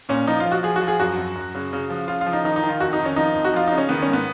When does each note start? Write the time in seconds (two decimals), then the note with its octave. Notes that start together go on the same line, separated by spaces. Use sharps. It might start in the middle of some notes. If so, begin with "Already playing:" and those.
0.09 A#2 C#4
0.27 F3 D#4
0.40 F4
0.45 F3
0.52 F#4
0.63 F3 G#4
0.76 F#4
0.82 F3
0.88 G#4
1.00 F#2 F#4
1.17 F#2
1.35 F#2
1.55 C#3
1.73 C#3
1.90 F3
2.08 C#3 F4
2.21 F4
2.26 F3
2.33 D#4
2.44 D#3 D#4
2.56 D#4
2.63 D#3
2.69 F4
2.80 F2 F#4
2.93 D#4
2.99 D#3
3.05 C#4
3.16 F3 D#4
3.35 F2
3.45 F#4
3.54 F3 F4
3.68 C#3 D#4
3.78 C#4
3.89 D#3 B3
4.02 C#4
4.07 G#2
4.13 B3